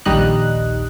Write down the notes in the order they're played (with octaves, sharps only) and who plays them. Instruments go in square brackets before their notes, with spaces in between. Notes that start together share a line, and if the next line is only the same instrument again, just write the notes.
[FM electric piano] A#1 D#2 G3 D#4 D#5 F#6